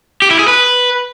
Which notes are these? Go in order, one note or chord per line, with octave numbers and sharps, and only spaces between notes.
G4
E4
G#4
B4